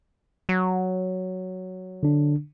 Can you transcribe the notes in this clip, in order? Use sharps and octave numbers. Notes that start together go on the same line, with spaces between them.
F#3
D3 D4